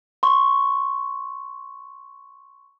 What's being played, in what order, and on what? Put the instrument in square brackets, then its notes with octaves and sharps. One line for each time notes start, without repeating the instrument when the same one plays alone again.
[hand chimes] C6 C#6